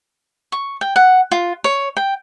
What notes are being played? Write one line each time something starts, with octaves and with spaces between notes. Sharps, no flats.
C#6
G5
F#5
F4
C#5
G5